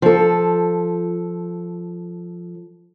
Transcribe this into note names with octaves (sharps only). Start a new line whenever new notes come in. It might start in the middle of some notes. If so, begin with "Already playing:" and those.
F3 A4